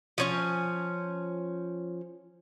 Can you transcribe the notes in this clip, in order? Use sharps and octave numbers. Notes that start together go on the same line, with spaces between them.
F3 C#4 G#5